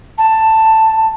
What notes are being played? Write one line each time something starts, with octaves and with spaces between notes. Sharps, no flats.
A5